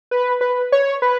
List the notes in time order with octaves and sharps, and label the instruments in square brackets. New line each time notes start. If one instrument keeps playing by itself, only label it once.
[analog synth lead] B4
B4
C#5
B4